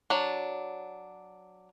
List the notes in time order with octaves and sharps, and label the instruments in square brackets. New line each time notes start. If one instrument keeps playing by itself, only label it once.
[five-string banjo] F#3 D4